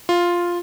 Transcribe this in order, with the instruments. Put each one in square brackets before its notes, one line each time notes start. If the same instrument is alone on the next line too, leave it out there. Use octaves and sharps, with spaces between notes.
[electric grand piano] F4